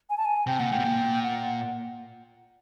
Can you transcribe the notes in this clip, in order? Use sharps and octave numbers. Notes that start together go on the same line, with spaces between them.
G#5
A5
G#5
C3 G5
A#2 F#5
A2 G5
B2
A#2
F#5